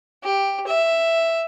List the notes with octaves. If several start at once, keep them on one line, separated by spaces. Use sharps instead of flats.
G4
E5